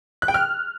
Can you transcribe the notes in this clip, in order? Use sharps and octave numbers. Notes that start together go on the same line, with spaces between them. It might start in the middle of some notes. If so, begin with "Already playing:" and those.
F#6
G5
F6